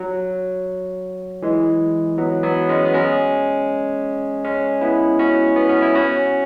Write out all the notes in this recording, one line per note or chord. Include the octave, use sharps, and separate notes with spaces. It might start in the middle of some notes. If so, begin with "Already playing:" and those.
Already playing: F#3
E3 G#3
F#3 B3
F#3 B3
G#3 C#4
B3
G#3 C#4
G#3 C#4
B3 E4
C#4 F#4
B3
C#4
E4
C#4 F#4